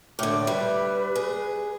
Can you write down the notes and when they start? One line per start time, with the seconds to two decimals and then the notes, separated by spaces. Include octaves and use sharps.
0.19 A2 D3 D6
0.47 G3 B4
1.16 G#4